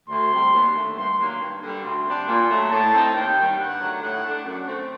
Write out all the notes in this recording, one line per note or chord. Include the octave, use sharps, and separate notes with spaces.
D2 C6
C3 G3
D#2
D3 A3
G2 C6
D#3 F#3 A#3 D4
G2
D3 G3
D2 C6
C3 G3 D4
A#2 C6
F#3 A3
A2 A5
A3 C4 D#4
D#2 G5
D#3 G3
G2 F#5
D3 F#3 A3 D#4
A2 F#5
A3 D4
F#2 F#5
D3 A3 C4